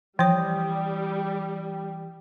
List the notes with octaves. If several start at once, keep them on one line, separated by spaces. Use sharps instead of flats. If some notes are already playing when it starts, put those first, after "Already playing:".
E3 F3 G3 C#5 G5 D#6